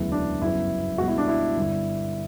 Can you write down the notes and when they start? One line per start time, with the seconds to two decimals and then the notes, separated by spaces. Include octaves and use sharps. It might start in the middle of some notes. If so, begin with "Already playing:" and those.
Already playing: E1 D2 C#3 F#3 B3 E4
0.12 D4
0.41 G1 F#2 C#3 F#3 B3 E4
0.98 C#2 B2 G3 F#4
1.08 E4
1.18 D4
1.28 E4
1.56 G1 G2 D3